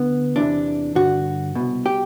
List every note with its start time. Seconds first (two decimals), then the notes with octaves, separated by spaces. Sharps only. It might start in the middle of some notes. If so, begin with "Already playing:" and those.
Already playing: D2 D3 B3
0.36 E2 C3 E3 D4
0.95 G2 D3 F#4
1.55 C2 B2
1.86 G4